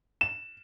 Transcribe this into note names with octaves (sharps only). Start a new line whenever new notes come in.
E7